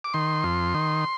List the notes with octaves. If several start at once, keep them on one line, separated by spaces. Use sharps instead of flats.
D6
D#3 C6
F2
D#3